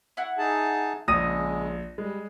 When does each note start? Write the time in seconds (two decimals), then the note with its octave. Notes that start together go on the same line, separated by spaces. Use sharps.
0.17 E4 F#4 F#5
0.38 D#4 G#4 A5
1.08 A#1 C#3 G#3 D#6 A#6 D#7
1.98 G3 G#3